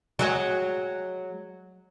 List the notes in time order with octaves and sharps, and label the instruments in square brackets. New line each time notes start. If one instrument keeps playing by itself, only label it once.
[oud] F#3 G#3 F#4